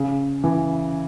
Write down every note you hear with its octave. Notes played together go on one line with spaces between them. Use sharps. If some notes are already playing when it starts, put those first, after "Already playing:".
Already playing: C#3
E3